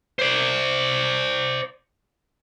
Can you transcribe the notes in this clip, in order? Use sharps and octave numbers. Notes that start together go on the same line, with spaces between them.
C5 D5